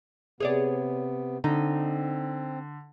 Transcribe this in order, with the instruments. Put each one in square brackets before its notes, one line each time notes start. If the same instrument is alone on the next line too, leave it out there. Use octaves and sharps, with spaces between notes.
[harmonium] C3 B3 [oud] G#4 C#5 D5
[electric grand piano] D3 [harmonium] C4 [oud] D#4